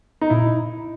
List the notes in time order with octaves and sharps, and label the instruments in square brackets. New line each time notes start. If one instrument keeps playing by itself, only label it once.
[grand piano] D#4
[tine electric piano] A#2 [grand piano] E4